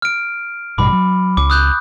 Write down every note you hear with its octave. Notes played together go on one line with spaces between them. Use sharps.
F6 D7
A1 G2 B2 B5 D6
F#3
C#2 D6
D#6 F#6 G6